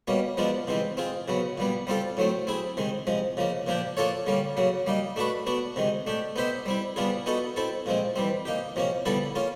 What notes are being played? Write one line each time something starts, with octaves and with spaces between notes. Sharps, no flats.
B2 G3 A#3 C#4
F3 G#3 B3 D4 F4
C3 E3 G#3 C4
C4 F4 G#4
C#3 F#3 B3
A#2 G3 B3
G3 C4 F4 A4
A2 F#3 A3 C4
C4 E4 G#4
C3 D#3 G#3
C3 F3 G#3
C#3 F3 A#3
A#2 F3 A#3 D4 G4
A#3 D4 F4 A4 C#5
D3 G3 A#3 C#4
C#3 F#3 A#3
G3 A#3 D#4
A3 D4 F#4 B4
B3 D4 F#4
C3 D#3 G#3
A3 D4 G4
B3 D#4 G4 C5 E5
G3 C4 E4
G3 B3 D4 F4 G#4
B3 D#4 F#4 A4
C4 E4 A4
A#2 F3 G#3 C4
E3 G3 C4
A#3 D#4 G4
C3 F3 A#3 C#4
D3 G3 B3 E4 A4
A#3 C#4 F4